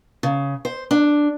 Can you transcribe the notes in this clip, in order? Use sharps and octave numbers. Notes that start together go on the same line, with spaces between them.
C#3
C5
D4